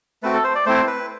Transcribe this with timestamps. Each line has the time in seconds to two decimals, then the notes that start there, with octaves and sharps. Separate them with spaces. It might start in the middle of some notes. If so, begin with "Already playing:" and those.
0.23 A3 C4 F#4 B4
0.34 A4
0.44 C5
0.55 D5
0.66 A3 C4 E4 C5
0.87 B4